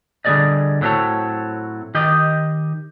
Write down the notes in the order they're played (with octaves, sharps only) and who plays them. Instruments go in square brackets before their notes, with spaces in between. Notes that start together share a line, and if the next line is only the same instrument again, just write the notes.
[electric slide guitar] D3 G3 G#3 G#4 D5 D#5
A2 F#3 C4 G4 A4 C#5
D#3 G4 D#5